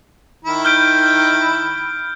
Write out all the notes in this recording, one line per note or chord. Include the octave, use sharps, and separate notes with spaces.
D#3 E4
F6 G6 D7